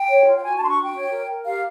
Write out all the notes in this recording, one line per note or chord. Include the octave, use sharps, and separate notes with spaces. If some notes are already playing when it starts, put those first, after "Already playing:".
Already playing: G5
C#5
F4
G5
F#4 G#5
A5
D4 C6
C#6
F#4
G5
C#5
A#4
A#4
G4 F5